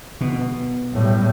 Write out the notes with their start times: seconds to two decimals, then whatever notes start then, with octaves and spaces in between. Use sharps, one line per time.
0.21 B2
0.93 A2 G3